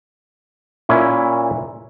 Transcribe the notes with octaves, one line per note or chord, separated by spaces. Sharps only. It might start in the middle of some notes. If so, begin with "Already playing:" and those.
A#2 C#4 E4